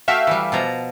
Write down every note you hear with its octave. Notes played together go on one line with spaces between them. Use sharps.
A3 F#4 E5 F5 G5
E3 G3
B2 F3 A#5